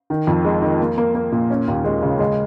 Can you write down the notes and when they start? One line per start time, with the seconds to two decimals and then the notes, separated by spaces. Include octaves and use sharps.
0.10 D#3
0.27 F2
0.45 G#3
0.62 D#3
0.80 A#3
0.98 A#3
1.15 A#3
1.32 A#2
1.50 C#4
1.68 D#2
1.84 G#3
2.03 C#3
2.19 G#3